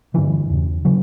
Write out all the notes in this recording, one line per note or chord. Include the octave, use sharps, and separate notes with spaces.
G2 D3 E3
E2 C#3
C#3 F#3